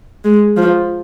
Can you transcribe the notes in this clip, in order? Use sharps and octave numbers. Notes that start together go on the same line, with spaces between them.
G#3
F3